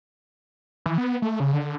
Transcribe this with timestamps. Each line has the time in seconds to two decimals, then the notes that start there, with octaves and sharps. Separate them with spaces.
0.86 E3
0.98 B3
1.22 A3
1.40 C#3
1.53 D3